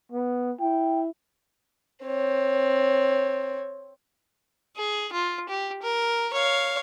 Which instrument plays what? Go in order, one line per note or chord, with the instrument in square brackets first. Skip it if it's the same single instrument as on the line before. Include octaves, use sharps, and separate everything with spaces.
[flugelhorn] B3
[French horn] E4 [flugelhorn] G5
[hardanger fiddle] C4 C#5
G#4
F4
G4
A#4
C#5 F5